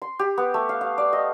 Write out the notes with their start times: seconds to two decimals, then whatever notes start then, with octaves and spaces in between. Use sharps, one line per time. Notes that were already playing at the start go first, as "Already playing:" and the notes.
0.02 C6
0.19 G4
0.38 B3
0.54 A3
0.69 F5
0.81 F5
0.98 D5
1.13 D#5